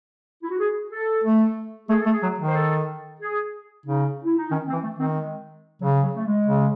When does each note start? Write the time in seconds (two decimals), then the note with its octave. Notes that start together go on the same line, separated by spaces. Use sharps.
0.43 E4
0.50 F#4
0.58 G#4
0.92 A4
1.24 A3
1.89 A3 G#4
2.01 A3 A4
2.11 G#4
2.23 F#3
2.39 D#3
2.48 C5
2.55 A4
3.20 G#4
3.86 C#3 D#4
4.24 E4
4.38 D#4
4.51 D#3 C#4
4.68 C4
4.72 E3
4.83 A3
4.95 D#3
5.00 C4
5.17 G#3
5.81 C#3 F#3
6.03 F#3
6.16 A3
6.26 G#3
6.47 C#3